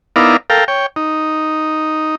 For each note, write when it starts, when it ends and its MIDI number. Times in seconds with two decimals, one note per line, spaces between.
0.16 0.37 59
0.16 0.37 63
0.16 0.37 64
0.16 0.37 70
0.16 0.37 74
0.16 0.37 77
0.50 0.64 69
0.50 0.64 70
0.50 0.64 77
0.50 0.64 79
0.68 0.86 73
0.68 0.86 79
0.96 2.15 63